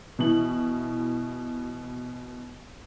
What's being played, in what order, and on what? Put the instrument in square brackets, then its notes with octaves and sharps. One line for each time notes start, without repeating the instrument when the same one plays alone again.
[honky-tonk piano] B2 E3 F#7